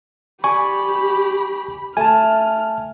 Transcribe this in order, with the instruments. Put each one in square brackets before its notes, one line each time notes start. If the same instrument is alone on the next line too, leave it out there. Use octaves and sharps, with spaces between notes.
[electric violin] G4 B5 [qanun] D5 [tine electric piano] G#5 C#6
[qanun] A3 [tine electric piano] G#5 A5 [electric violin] F6